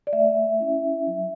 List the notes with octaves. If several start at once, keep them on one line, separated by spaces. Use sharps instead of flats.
D5
A3 E5
C#4 E4
F#3